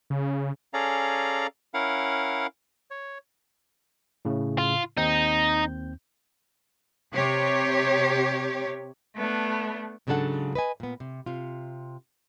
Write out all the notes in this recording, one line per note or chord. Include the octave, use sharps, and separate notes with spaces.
C#3
C#4 G#4 A4 D5 F5 A#5
C#4 E4 A#4 F5 F#5
C#5
A2 C#3
F4
D#2 C4 D#4 G6
C3 G4 C#5
A3 B3 D4
G#2 C#3 F#3 D4 A4 F#5
B4 D#5 G#5
A#2 B3
C3
C3 F4